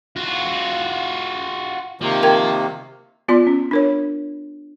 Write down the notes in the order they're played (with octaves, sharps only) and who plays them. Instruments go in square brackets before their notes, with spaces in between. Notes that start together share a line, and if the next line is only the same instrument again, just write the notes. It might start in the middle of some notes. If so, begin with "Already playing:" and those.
[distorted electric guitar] F4 F#4
[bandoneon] C3 D#3 A#3 [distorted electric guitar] F3
[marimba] A#4 G5 G#6
[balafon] B3 F4 D5 C6
C#4
D4 A#4 C#5